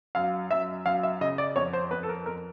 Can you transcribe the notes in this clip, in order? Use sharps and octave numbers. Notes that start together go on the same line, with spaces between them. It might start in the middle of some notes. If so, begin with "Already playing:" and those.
F#2 F5
F#2 E5
F#2 F5
E5
C#3 D#5
D5
F2 C#5
C5
F2 B4
A4
A#4
F2 A#4